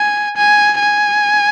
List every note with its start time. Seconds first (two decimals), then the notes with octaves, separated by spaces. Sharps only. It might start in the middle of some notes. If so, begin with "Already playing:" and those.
Already playing: G#5
0.37 G#5
0.80 G#5